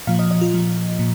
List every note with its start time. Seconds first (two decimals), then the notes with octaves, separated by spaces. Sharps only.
0.07 A#2 F3 F5
0.19 D#5
0.31 D#5
0.41 F4
0.54 A#2 F3
0.99 A#2